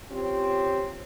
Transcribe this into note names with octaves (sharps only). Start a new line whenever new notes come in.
C4 C#4 F4 G4 C#5